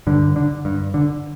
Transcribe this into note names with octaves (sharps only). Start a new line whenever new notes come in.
G2 D3
D3
G2
D3